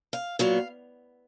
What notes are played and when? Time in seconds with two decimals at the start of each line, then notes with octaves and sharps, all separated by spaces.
0.13 F5
0.39 A#2 F#3 B3 F5